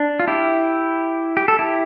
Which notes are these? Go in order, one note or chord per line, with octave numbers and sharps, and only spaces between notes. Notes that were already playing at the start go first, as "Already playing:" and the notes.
Already playing: D4
F4
E4 G4
G4
A4
E4 G4